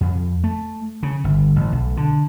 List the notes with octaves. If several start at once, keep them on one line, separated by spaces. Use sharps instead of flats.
F2
A3
C#3
G1
A1
B1
D3